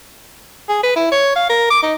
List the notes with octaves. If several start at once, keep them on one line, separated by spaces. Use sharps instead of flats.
G#4
B4
E4
C#5
F5
A#4
D6
D#4